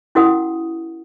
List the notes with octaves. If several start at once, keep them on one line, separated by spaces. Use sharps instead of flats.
C#4 E4 F#4 A#4 F#5 D#6